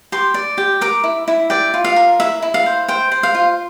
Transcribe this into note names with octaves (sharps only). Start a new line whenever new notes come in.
G4 C6
D5
G4
A#4 D6
E4
E4
D5 G5
F4
F5
A#4
E4 E5
E4
F5
C5
C5 G5
C5
F5
F4